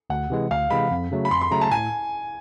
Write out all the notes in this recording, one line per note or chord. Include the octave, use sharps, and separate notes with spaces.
D2 F#5
C3 E3 G#3
D2 F5
C3 E3 G#3 B5
F2
C#3 F#3 A3
B5
F2 C6
C6
C#3 F#3 A3 A#5
A5
A2 G#5